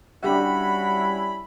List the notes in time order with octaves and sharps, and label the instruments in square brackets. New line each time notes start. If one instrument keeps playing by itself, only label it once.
[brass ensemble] G3 C#4 E4 [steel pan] D4 G4 E5 [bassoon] F#4 [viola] B5